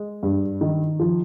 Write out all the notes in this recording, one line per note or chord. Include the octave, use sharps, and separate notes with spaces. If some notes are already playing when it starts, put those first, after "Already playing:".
Already playing: G#3
G2
D#3
F3